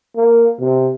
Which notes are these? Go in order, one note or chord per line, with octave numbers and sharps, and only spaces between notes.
A#3
C3